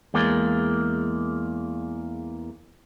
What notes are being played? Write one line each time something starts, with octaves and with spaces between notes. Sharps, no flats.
E2 G#3 A#3